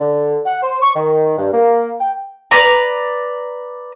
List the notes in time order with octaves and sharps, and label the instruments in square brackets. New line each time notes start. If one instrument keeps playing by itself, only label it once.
[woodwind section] D3
F#5
C5
C#6
D#3
G2
A#3
G5
[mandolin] B4 D5 A#5